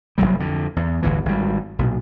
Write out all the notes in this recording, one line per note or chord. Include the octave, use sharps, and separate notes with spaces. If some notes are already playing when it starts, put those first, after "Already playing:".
F1 F#2 F#3 G3
F2 D3
E2
G1 D2 A2 E3
G#1 G3
B1 A#2